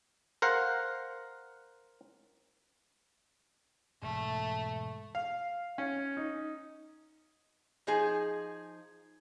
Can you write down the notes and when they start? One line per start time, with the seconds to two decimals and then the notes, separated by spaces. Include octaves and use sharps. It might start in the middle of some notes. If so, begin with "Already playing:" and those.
0.42 A#4 C5 F5 F#5
4.02 E1 G#2 A3
5.15 F5
5.78 C#4
6.17 D#4
7.87 F3 D#4 G#4